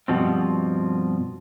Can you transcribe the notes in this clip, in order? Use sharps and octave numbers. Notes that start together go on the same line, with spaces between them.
G2 B2 F3 C4